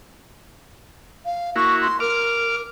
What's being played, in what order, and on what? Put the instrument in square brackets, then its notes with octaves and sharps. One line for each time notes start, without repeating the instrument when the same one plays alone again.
[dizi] F5
[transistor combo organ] A#3 E4 F#4 [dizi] C#6
[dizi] C6
[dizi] A#4 [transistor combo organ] D6 F6